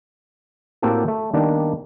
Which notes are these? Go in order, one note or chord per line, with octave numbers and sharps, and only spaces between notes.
A2 A#3 C4 F#4 G4 A4
A3
D#3 G3 A#3 B3 D4